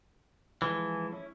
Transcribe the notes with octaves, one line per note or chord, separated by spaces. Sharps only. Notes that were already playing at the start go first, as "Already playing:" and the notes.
E3 F3 G#3 A4
C#4 E4